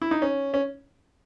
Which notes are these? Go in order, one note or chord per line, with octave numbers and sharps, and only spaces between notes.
E4
D#4
C#4
C#4